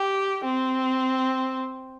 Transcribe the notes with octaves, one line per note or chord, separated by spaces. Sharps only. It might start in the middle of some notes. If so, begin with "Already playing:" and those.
Already playing: G4
C4